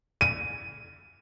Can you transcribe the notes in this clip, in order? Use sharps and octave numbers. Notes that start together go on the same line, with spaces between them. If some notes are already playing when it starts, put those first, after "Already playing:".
D#7